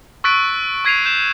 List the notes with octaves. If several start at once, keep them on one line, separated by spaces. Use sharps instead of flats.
C#6 E6 F#6 A6 B6 D7
C#6 G#6 B6 C7 D#7 F7
G6 E7